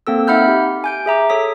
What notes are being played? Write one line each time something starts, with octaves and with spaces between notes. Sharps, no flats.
A#3 C4 A4 E6
D#4 E5 F#5 B5 F6 G6
G4
G#5 G6 D7
G#4 E5 A#5 D6
A4 C#5 D#6 B6